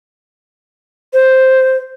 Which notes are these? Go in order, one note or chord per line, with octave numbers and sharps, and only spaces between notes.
C5